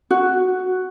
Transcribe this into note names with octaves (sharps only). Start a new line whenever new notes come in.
F#4